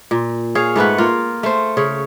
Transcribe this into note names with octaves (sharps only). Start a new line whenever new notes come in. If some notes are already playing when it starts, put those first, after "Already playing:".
A#2
G#4 C#5 F5
G#2 A3 B4 F#5
A#3 F4
A3 C5
C#3 C#5